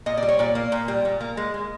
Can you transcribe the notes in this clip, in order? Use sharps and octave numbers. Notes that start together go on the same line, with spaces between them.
A#2 D#5
D5
G3
C#5
A#2 D5
A#3
A#2
G3
A#2
A#3
G#3
G#3